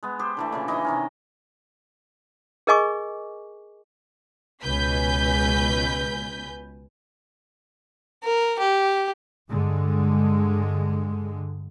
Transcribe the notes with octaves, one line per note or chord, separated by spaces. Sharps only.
G#3 B3
G4 C5
D3 E3 A3
A#2 C#3 E3
D#3 E3 D#5 E5
C3 D#3 C#4
G#4 A#4 D#5 G#5 C#6 D6
C#2 B2 B4 G#5 G6 B6
A#4
G4
G2 D3 G#3